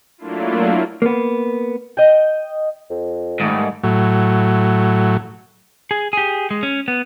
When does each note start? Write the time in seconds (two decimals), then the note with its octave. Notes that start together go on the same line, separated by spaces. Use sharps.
0.18 F#3 A3 A#3 D4 E4 F4
1.02 A#3 B3
1.97 D#5 G5
2.90 F2
3.40 G#2 D#3 G3 A3
3.83 A2 F#3
5.91 G#4
6.13 G4 G#4
6.51 G#3
6.63 C#4
6.88 B3